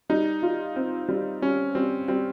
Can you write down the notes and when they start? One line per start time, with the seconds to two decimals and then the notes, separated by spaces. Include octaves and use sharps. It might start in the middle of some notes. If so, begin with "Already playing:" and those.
0.09 G3 D#4
0.42 F4
0.76 C4
1.08 G3
1.42 G3 C#4
1.75 G3 C4
2.08 G3 C4